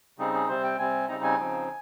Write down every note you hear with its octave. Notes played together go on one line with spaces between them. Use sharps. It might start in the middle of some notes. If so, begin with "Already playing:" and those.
C#3 G3 C4 D#4 G#4
G#4
C3 G3 C4 C5
G5
C3 G3 C4 G#5
C#3 G3 C4 D#4 A#5
G#5
C#3 F3 C4 D#4